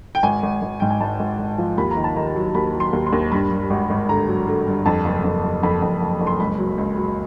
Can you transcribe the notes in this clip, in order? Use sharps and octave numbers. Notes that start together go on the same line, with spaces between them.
G5
G#1 G#5
G#1
G#1
G#2 G5
G#5
G#1 A5
G#1
G#1
F3
D#2 B5
A#5
D#3
A5
D#3 A#5
F#3
D#2 B5
F#3
C6
D#2
C6
D#2
G2 B5
G2
G#1
G#1
D3 A#5
F#3
D3
G2
F2 A5
F#1
F2
F#1
F2 B5
F2
F#1
F#1
C6
C#2 B5
F#3
C#2
F#3